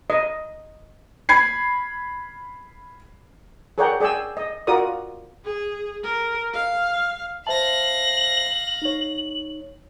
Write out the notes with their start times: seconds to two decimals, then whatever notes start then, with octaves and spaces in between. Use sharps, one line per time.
0.10 D#5
1.29 B5 G#6 C7
3.78 G#4 A#4 C#5 D5 F#5 G5
4.00 G#4 D5 G5 G#5 E6
4.37 D#5
4.67 F4 F#4 A#4 D5 D#6
5.45 G#4
6.04 A#4
6.53 F5
7.47 C5 E5 F5 A5 A#6 F#7
8.82 D#4 C#5